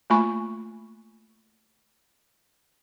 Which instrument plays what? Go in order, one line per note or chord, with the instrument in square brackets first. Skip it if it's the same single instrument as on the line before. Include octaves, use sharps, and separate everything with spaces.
[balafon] A3 A#3 F4 G#5 B5 C#6